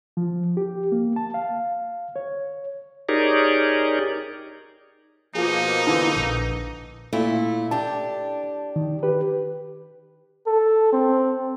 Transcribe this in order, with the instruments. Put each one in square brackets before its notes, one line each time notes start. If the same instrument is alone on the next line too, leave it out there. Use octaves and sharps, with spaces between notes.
[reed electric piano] F3
G4
A#3
A5
F5
C#5
[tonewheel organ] D#4 G4 G#4 A#4 C#5 D5
[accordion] B2 F3 A#3 [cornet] D#4 [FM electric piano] F4 G#4
[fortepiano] D3 E3
[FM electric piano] A#1
[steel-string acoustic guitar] A#2 A3 E4
[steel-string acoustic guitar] D4 G4 [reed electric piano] A5
[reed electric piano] D#3
G4 B4
[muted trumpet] A4
C4